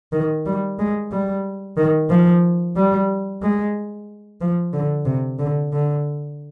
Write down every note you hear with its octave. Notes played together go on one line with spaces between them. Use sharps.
D#3
G3
G#3
G3
D#3
F3
G3
G#3
F3
D3
C3
D3
D3